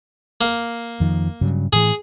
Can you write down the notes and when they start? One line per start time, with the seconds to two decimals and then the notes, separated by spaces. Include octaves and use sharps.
0.41 A#3
1.00 F2 D#3 F3
1.41 G2 C#3 F#3
1.73 A2 E3 G#4